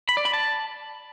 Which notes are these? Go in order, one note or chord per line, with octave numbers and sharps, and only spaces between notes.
B5
D5
B5
A5